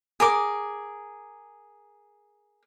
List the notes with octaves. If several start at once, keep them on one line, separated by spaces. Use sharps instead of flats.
G#4 A#4 D6